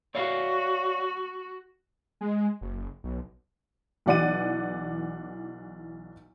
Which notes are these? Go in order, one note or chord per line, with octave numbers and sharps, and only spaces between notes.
F#4 C#5 D5 F5
G#3
F#1
B1
B1 E3 D5 F#5 D6 D#7